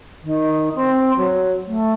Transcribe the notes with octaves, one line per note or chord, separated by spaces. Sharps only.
D#3
C4
F#3
A3